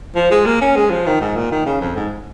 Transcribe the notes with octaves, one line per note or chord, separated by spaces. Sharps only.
F3
G#3
A#3
C#4
G#3
F3
D#3
G#2
A#2
D#3
C#3
F2
G#2